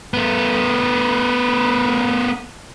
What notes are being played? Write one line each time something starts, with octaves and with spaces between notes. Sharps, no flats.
A3 B3